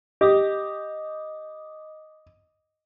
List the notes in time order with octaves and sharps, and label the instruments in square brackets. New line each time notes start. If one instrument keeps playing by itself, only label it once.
[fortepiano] G4 [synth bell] D#5 D6 D#6